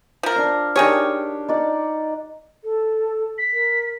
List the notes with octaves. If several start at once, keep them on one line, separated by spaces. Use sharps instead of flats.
F3 A#4
D4 F5
D#3 D4 G4 G#4 C#5
D#4 D5 F#5
A4
B6
A#4